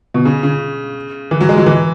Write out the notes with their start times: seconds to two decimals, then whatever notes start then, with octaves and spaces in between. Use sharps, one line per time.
0.14 B2
0.25 C#3
0.43 C#3
1.31 E3
1.41 F#3
1.49 G#3
1.58 F#3
1.66 E3